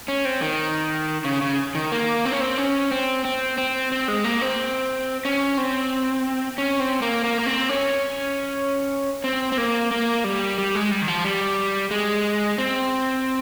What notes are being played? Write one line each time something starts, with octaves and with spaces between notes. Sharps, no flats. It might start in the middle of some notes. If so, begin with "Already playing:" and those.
C#4
C4
D#3
C#3
C#3
D#3
A#3
C4
C#4
C4
C#4
C4
C4
C4
C4
G#3
A#3
C4
C#4
C4
C#4
C4
A#3
A#3
A#3
C4
C#4
C4
C4
A#3
A#3
G3
G3
G#3
G3
D#3
F3
G3
G#3
C4